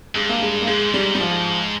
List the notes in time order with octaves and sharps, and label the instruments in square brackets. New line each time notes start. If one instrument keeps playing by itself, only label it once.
[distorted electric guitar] G2 [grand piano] G#3
[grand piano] A#3
G#3
A#3
[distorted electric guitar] G#2 [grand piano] G#3
[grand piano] G3
G3
F3